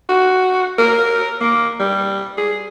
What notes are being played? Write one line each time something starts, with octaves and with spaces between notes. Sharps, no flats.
F#4
A#4
A#3
G3
G#4